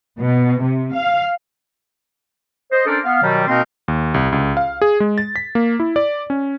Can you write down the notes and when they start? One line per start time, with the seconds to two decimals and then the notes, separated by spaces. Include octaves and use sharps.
0.20 B2
0.61 C3
0.95 F5
2.71 C5 D#5
2.86 C#4 D4 A4 A#4 C5 D5
3.03 B3 F5
3.22 B2 D#3 F#3 G3
3.48 B2 A#3 C4 D#4 A#4 C6
3.88 D#2
4.14 C2
4.32 C#2
4.57 F5
4.82 G#4
5.00 G#3
5.18 A6
5.36 B6
5.55 A#3
5.80 E4
5.96 D5
6.30 C#4